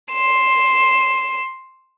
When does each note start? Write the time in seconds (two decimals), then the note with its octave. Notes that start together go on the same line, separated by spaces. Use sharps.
0.13 C6 E7